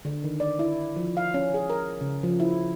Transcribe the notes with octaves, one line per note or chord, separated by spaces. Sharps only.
D3
D#3
D5
E4
F3
F5
C#4
G#4
A#4
C#3
F3
E4